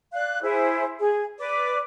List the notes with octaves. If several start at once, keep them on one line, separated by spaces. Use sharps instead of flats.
D5 F5 F#6
E4 G#4 C5
G#4
B4 D5 D6